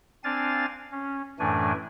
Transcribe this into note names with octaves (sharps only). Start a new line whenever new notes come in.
C4 D4 F5 G#5 A6
C#4
F#2 A2 E3 A3 D4 G#5